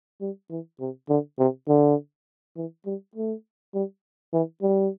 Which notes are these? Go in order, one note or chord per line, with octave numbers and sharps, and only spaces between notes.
G3
E3
C3
D3
C3
D3
E3
G3
A3
G3
E3
G3